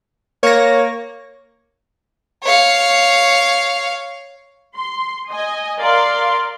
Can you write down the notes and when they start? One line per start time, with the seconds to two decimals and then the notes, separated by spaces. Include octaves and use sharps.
0.43 A#3 C#5 A#6
2.44 C#5 F5
4.78 C6
5.31 D#5 G#5
5.79 A#4 D5 F5 C6